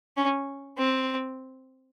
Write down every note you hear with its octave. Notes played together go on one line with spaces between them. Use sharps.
C#4
C4